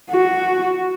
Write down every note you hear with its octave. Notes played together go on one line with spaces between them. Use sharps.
F#4